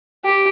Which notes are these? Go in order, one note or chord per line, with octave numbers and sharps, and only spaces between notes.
G4